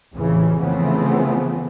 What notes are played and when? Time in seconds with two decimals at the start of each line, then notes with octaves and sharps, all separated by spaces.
0.14 A1 F2 C#3 E3
0.60 C#3 E3 F3 A3 B3 C4